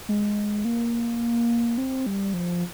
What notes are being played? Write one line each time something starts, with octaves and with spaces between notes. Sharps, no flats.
G#3
A#3
C4
G3
F3